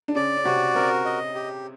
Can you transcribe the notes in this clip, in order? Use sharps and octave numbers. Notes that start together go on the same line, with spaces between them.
D4
C#3 C#4 D5
C#4
C3 C4 F#4
C3 C4 A#4
D#5
G4